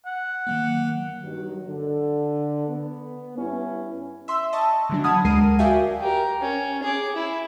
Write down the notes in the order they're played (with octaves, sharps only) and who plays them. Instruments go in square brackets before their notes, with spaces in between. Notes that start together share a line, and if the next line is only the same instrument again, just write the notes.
[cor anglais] F#5
[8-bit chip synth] D#3 F#3 A#3
[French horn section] G2 D#3 F#3
D3
B3
G2 C#4 E4
[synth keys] E5 C6 E6
D#5 A5 C#6
D3 E3 F#3 D4
F#5 A5 B5 D#6 F6 G#6
D2 G#3 A#4 C7 D#7
F#4 D5 E5 F5 G5 G#5
[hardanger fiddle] G4 A#4
C#4
G#4 D6
E4